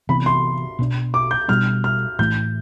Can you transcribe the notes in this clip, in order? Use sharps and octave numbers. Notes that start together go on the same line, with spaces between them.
C3 E3 B3 B5
C6
B2 B3 D4
D6
G6
B2 G3 D4 F6
F6
A2 E3 A3 G6